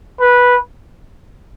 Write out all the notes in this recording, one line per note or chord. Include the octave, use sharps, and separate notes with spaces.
B4